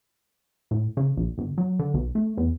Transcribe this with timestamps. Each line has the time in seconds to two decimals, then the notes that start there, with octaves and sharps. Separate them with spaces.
0.71 A2
0.97 C#3
1.17 A#1
1.38 G1
1.58 F#3
1.79 D3
1.94 B1
2.15 A3
2.37 E2